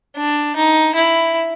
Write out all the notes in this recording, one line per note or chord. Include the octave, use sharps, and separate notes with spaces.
D4
D#4
E4